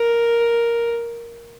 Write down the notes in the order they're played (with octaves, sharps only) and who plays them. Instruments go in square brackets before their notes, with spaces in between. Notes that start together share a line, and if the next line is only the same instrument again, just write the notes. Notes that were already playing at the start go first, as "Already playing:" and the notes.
Already playing: [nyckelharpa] A#4